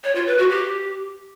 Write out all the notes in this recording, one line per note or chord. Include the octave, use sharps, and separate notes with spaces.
C#5
F4
B4
F#4
G4